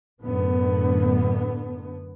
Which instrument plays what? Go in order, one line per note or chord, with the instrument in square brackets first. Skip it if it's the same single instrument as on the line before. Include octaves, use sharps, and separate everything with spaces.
[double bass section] F#2 A2 D3 B3